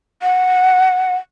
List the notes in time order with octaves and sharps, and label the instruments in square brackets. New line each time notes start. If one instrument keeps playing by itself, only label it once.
[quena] F#5